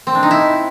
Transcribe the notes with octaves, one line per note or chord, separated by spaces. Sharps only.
C4
D4
D#4
E4